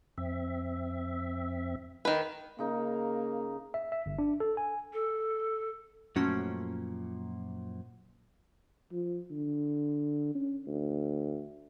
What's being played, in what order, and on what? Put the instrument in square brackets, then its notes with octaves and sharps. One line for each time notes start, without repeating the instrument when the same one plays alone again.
[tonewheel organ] F2 C4 E5
[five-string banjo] D#3 B4
[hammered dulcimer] C#3 D#4 A#4 [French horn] A#3
[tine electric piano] E5
E5
G1
D4
A4
G#5
[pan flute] A4
[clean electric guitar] F#2 A#2 F3 [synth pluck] A3 C#4 F#4
[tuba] F3
D3
C#4
D2